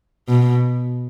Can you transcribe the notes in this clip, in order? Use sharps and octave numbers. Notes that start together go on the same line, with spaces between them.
B2